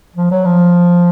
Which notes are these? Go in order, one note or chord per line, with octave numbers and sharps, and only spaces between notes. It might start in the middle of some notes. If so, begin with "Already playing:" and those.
F3
F#3
F3